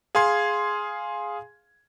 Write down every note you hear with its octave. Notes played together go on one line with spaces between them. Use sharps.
G#4 F5 G#5 C6 G#6